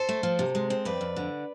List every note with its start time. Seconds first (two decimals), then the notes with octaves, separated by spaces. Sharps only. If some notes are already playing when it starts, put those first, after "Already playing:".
Already playing: A4 C5
0.09 A3
0.23 F3
0.39 C3
0.55 G#3
0.70 C4
0.85 F2 B4 D5
1.01 F2
1.16 D3